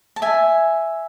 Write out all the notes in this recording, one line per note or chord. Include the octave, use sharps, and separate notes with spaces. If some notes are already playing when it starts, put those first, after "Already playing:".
A5
E5 G#5